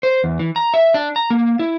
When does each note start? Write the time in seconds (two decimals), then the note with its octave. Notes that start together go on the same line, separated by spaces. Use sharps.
0.03 C5
0.24 E2
0.39 E3
0.56 A#5
0.74 E5
0.94 D4
1.16 A#5
1.30 A#3
1.59 E4